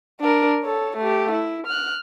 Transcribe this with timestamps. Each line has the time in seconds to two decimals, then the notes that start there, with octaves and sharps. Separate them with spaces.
0.20 D4 A#4
0.63 A4 C#5
0.97 A3 G4
1.31 E4
1.67 F6 F#6